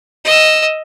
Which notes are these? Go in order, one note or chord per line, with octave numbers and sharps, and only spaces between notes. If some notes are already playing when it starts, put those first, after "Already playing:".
D#5 E6